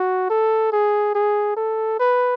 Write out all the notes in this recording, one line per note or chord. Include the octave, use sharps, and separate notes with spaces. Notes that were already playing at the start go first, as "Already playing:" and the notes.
Already playing: F#4
A4
G#4
G#4
A4
B4